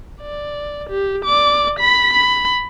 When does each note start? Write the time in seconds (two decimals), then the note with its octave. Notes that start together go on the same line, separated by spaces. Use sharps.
0.22 D5
0.89 G4
1.25 D5 D6
1.80 B5 B6
2.13 B5